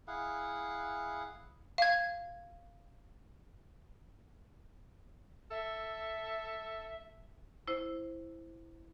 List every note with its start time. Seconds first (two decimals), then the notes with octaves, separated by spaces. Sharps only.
0.08 E4 G#4 F5 F#5
1.78 F5 G#6
5.51 A4 E5
7.68 E4 C5